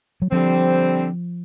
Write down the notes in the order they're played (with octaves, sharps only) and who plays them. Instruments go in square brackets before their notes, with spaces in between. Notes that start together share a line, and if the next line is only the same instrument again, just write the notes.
[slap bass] F#3
[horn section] D3 G3 C4 [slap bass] F3